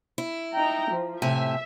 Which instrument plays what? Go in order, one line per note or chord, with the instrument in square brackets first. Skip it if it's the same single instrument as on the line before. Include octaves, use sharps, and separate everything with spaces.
[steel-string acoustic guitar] E4
[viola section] D#4 G5 A#5
F3
[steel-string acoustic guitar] A2 C3 G#5 [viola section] E5